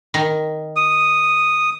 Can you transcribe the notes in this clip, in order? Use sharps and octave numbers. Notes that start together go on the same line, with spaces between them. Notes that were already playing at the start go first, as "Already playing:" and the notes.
D#3
D#6